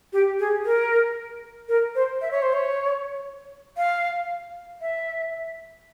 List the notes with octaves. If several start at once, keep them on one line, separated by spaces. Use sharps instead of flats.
G4
G#4
A#4
A#4
C5
E5
C#5
C5
C#5
F5
E5